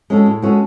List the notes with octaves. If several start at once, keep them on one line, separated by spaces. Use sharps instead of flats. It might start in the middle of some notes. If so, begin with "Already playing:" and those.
G#3 C#4 F#4 A4
A2
G#3 C#4 F#4 A4